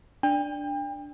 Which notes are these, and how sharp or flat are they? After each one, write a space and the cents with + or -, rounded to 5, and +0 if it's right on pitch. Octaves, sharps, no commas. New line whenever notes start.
D4 +0 G5 +35